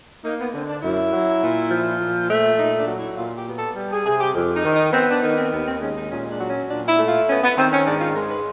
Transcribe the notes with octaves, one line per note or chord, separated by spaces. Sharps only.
A#3 D#4
B3
D3 C4
D4
F#2 E4
F#3
A#2
F3
A#2
A3
A#2 D#4
D4
F#3
E4
A#2 F4
G4
B3
A4
G3
G#4
C3 G#4
G4
F2
D#4
D#3
D#4
B3 C4
D4
D#3 D#4
C4
D#2 B3
C4
G#3 C#4
D#4
A#2 C#4
D4
F#3
C#4
A#2 D4
E4
A3
F4
B3 C#4
B3
D#3 C4
C#4
G#2 D4
F4
G#3 A#4
B4